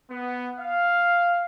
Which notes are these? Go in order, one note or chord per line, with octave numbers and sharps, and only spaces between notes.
B3
F5